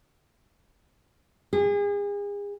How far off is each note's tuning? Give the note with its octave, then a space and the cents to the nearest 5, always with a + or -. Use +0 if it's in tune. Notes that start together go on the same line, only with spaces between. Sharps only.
G#4 -35